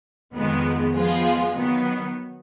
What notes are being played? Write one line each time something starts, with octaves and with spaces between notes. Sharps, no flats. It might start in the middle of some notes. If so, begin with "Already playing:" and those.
F2 D#3 G#3 B3
F3 G#3 B3 F4 G#4
D#3 F#3 B3